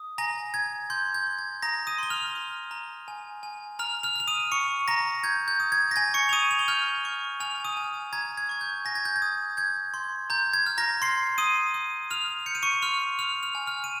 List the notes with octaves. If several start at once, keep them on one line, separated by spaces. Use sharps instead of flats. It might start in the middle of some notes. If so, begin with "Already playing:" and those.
Already playing: D#6
G#5 A#5 A#6
G#5 G#6
C6 G6
G6
G6
G#6
A#5 D#6 A#6
D#6 D#7
C6 G7
F6 F7
D#6
A#5
G#5
G#5
A#5 F6 F7
F6 F7
F6 F7
D#6 D#7
C#6 C#7
A#5 A#6
G6 G#6
G6
D#6
G#6
A#6
G#5 G#6
C#6 C#7
F7
D#6 D#7
F7
G7
F6 G6 F7
C#6
G#5 F6 F7
D#6 D#7
G#5
A#5 G#6
G#6
C#6 G#6
G6
G#5 A#6
G#6
G6
G#6
D#6
G6 G#6
C6
A#5 G6
G#6
F6
A#5 A#6
C6 C7
C6 D#6 D#7
D#6
D#6 F6 F7
G6 C#7
D#7
C#6 C#7
C6 F6 F7
D#6 F6 F7
F6 F7
G#5
F6 F7
D#7